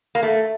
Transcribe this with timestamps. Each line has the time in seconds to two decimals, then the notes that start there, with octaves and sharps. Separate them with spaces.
0.15 A#3
0.23 A3